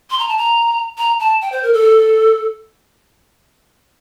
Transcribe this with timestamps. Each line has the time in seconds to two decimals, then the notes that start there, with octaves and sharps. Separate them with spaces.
0.11 C6
0.19 A#5
0.28 A5
0.38 A#5
0.98 A#5
1.20 A5
1.41 G5
1.52 C5
1.63 A#4
1.73 A4